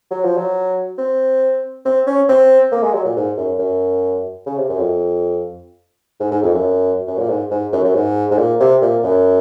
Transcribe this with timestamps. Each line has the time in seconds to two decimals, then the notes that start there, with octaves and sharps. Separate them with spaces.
0.11 F#3
0.24 F3
0.37 F#3
0.98 C4
1.85 C4
2.07 C#4
2.29 C4
2.72 A#3
2.82 G#3
2.93 F#3
3.05 A#2
3.16 G#2
3.37 F#2
3.59 F#2
4.46 C#3
4.57 C3
4.69 F#2
4.79 F2
6.20 G#2
6.31 G#2
6.43 F2
6.54 F#2
7.07 F#2
7.19 A#2
7.29 G#2
7.51 G#2
7.73 F#2
7.84 F#2
7.95 G#2
8.31 G#2
8.38 A#2
8.60 C3
8.82 A#2
9.04 F#2